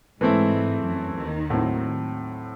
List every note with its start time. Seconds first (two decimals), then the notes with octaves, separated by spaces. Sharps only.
0.21 G#2 E3 G#3 A3 C4 E4
0.86 F#2 F#3
1.18 D#2 D#3
1.50 A2 F#3 C4